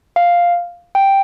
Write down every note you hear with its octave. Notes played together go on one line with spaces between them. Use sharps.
F5
G5